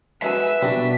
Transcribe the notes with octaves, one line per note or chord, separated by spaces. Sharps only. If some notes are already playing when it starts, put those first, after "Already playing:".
G#3 F#4 B4 E5 G#5 E6
B2 G3 D4 F#4 B6